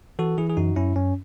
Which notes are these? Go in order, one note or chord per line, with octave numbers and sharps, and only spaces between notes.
E3 F#4 A4
E3 E4 G#4
G#4
F#2 D#4 F#4
F#2 C#4 E4
F#2 C#4